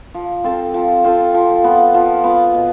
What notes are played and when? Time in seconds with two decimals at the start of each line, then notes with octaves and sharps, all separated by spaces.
0.14 F3
0.44 C4 F4 A4
0.74 F3
1.04 C4 F4 A4
1.34 F3
1.64 B3 F4
1.94 F3
2.24 B3 F4
2.54 B2